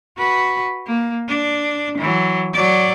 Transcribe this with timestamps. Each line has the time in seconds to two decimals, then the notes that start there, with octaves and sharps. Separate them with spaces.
0.18 F#4 B4
0.87 A#3
1.28 D4
1.98 E3 F#3
2.54 F#3 D5